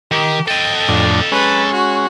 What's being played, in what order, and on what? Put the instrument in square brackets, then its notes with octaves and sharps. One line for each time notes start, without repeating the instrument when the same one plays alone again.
[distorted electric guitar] D#3 [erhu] G4
[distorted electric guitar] A4 D#5 [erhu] G5
[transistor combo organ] F2 A2 D4
[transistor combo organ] G#3 C#4 [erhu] B4
[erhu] F#4